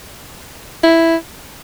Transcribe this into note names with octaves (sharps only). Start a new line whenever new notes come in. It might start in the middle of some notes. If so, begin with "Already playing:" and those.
E4